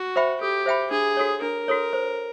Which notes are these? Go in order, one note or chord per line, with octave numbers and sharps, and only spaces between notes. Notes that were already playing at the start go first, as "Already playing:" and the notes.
Already playing: F#4
C5 E5 G5 B5
G4 A4
C5 E5 G5 B5
D4 G#4
F#4 A4 C#5
D4 A#4
F#4 A4 C#5
C5